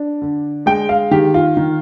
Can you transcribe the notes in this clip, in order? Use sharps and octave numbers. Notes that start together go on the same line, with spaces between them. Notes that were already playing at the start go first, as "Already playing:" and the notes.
Already playing: D4
D3
G#3 G5
F5
D#3 G4
F4
D#3